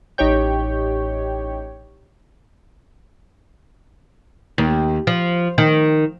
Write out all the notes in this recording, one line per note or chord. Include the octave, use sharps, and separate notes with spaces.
A1 D#4 G4 C#5 G5
D#2
F3
D#3